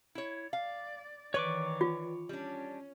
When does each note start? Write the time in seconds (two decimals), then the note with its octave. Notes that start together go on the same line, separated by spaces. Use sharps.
0.15 E4 C#5
0.53 D5 F5
1.34 D#3 E3 B4 C#5 D5 C#6 D6
1.81 F4
2.29 G3 C#4 D4